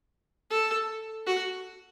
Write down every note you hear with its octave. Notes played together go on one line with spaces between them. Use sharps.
A4
F#4